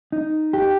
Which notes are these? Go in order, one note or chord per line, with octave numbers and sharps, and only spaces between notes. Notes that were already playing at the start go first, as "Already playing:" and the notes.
D#4
G4